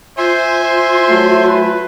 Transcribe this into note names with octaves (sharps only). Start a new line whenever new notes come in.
F4 C5 E5 G#5 C6
C5
F#3 A3
B4